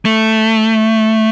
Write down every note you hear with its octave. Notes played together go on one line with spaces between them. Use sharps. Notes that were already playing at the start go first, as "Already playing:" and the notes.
A3